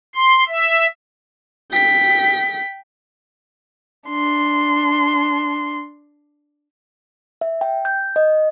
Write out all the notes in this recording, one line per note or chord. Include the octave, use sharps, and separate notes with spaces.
C6
E5
G5 B6
D4 C6
E5
G5
G6
D#5